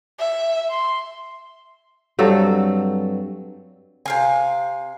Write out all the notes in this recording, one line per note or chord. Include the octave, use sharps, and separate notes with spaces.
E5
C6
G2 F#3 C4 A4
C3 F5 G#5